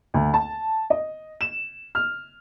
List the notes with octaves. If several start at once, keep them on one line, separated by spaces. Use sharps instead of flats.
D2
A5
D#5
E7
F6